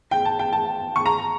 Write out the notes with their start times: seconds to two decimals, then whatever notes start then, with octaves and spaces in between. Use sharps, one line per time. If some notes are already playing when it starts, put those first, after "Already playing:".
0.11 G5
0.25 A5
0.39 G5
0.53 A5
0.96 C#6
1.06 A#5